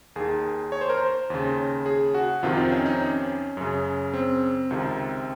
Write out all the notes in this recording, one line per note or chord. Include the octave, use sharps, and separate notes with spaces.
D#2 D#3 G#4
C#5
C5
A#4
C5
D#2 C#3
G#4
F#4
F2 C3 D#3 F4
D#4
C#4
D#4
C#4
F#2 C#3
C4
C#2 C3 D#3